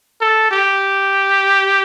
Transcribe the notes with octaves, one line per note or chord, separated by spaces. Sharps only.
A4
G4